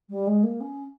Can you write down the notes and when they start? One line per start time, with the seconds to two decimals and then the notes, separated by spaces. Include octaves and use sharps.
0.09 G3
0.26 G#3
0.43 A#3
0.60 C#4